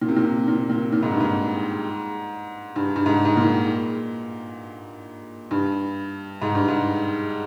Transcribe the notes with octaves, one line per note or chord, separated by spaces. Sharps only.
A#2
C3
A#2
C3
A#2
A#2
A#2
G#2
G2
G#2
G2
G2
G#2
G#2
A#2
G2
G#2
G2
G#2